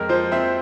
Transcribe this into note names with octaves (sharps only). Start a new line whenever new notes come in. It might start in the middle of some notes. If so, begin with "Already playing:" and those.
Already playing: F2 G#3 A#4
F3 C5
C4 E5